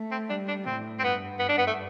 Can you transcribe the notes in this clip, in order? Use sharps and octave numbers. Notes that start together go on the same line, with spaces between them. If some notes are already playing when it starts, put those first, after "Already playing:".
Already playing: A3
C4
G3 D4
D4
A2 C4
C4
G2 B3
B3
D4
B3
A3